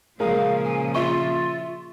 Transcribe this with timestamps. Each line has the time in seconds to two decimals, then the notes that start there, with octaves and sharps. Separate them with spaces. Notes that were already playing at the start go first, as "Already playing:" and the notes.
0.20 A#2 C#3 F3 G#3 A#4 F5 D#6
0.64 G#5
0.95 F4 E5 C6 C#6